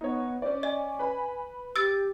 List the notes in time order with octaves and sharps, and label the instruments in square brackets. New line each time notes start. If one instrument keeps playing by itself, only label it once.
[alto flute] B3 [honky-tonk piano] D#4 C#5
[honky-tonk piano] C#4 D5 [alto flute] C5
[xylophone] D#5 [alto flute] G#5
[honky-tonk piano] B4 B5
[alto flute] G4 [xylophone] E6 A6